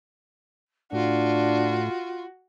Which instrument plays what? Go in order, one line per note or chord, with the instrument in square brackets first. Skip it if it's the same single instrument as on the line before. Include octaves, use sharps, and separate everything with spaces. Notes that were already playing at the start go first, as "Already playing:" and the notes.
[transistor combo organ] A2 [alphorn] D4 [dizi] F4 [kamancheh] F#4